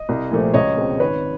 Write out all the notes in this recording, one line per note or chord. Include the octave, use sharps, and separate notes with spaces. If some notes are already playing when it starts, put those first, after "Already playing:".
Already playing: D#5
C2
A#2 F3 A3 C4
C#2 C#5 D#5
B2 G#3 C4
G#1 B4 C#5